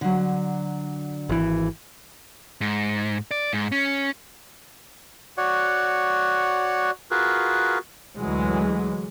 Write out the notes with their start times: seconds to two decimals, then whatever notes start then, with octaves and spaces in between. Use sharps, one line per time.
0.01 D3 F#3
1.29 G#1 E3
2.61 G#2
3.31 D5
3.53 G#2
3.72 C#4
5.37 F#4 C#5 D5 F#5
7.11 F4 F#4 G#4 A#4 B4
8.19 D2 E3 F#3 G#3